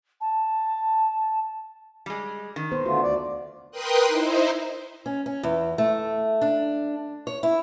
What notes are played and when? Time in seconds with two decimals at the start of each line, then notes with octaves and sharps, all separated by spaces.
0.21 A5
2.06 G3 G#3
2.56 D#3
2.72 B3 C5
2.86 D3 A3 F4 F#4
3.03 D2 D5
3.71 A#4 B4 G5 C6 D#6 F#6
4.07 D#4 E4 C5
5.06 C#4
5.26 C#4
5.43 E2
5.78 A3
6.41 D4
7.27 C#5
7.43 E4